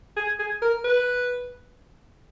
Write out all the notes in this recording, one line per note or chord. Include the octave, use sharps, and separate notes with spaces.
G#4
G#4
A#4
B4